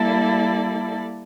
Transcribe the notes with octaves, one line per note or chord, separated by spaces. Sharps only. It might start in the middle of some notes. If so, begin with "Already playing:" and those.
Already playing: G3 A#3 E4 A4 D5